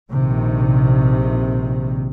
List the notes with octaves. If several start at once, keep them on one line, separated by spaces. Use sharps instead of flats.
A#1 C3 D#3